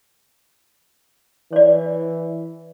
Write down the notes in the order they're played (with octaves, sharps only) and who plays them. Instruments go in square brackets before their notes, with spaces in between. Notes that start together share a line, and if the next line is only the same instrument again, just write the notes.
[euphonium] E3 [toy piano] C#5 D5